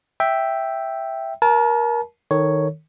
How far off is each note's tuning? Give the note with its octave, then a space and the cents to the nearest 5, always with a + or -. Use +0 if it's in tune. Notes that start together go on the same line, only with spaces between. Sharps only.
E5 +0 G5 +0
A#4 +20 A5 -30
D#3 +0 A4 +25 C#5 +0